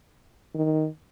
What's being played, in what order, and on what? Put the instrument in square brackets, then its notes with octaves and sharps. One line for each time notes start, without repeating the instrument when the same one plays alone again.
[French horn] D#3